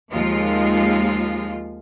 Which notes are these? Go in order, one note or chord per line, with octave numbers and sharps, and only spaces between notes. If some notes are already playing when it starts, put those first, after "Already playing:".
D#2 F3 G#3 F4